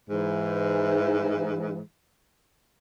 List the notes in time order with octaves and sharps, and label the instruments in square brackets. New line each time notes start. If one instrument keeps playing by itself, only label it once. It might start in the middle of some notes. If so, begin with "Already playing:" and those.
[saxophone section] G#2 E3